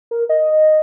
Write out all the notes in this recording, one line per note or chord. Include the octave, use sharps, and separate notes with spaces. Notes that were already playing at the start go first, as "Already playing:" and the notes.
A#4
D#5